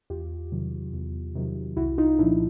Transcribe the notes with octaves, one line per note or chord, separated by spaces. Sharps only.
E2 F4 G4
C3 D#3 F#3
E2
C3 D#3 F#3
C2 E4 F#4
D#4 F4
A#2 F3 D4 E4